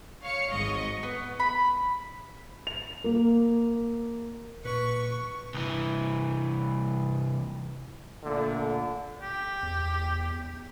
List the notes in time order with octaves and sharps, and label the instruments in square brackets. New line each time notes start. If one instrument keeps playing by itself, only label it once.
[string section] C#5 F5 C#7
G#1 G#2 D#5 C#6
[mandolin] B3
B5
[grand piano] F7
A#3
[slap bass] A#2 [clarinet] B4 [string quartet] C#6
[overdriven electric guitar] C2 E3
[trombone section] A#2 D3 A3
[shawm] G4
[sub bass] E2